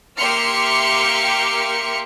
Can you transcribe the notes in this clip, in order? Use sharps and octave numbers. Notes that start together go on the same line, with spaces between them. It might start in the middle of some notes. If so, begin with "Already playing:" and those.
A#3 G4 E5 C6 F6 C#7